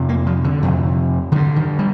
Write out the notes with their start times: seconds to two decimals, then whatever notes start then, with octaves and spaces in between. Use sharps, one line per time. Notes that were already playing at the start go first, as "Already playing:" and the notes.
Already playing: F2 C3
0.09 A#3
0.27 F3
0.44 D3
0.62 F2 C3
1.32 D3 D#3
1.35 G2
1.56 D#3
1.79 G3